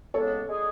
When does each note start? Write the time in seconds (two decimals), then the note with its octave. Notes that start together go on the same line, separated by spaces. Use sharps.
0.14 E2 C#3 G#3 B3 D4 A4 C#5
0.47 G#3 D4 G#4